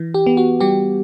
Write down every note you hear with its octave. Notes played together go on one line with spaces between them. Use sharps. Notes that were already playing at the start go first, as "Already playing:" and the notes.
Already playing: E3
G4
B3
F#4
G3 G4